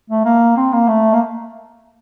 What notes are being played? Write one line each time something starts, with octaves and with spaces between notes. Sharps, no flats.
A3
A#3
C4
A#3
A3
A#3